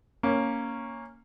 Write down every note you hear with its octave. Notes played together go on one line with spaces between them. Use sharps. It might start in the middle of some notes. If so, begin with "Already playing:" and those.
A#3 C#4